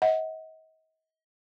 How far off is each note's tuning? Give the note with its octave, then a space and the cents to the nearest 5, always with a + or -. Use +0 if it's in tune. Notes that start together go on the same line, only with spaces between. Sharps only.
D#5 +40 F#5 +0